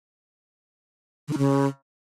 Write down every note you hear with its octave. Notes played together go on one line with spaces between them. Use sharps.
D3
D#4
C#3